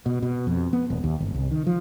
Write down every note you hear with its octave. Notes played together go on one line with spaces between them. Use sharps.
B2
B2
F2
B3
D#1
D#2
G1
C2
D#3
F3